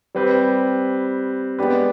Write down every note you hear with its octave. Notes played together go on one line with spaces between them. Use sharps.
G3 C4 G4 B4
G#3 B3 D4 G4 B4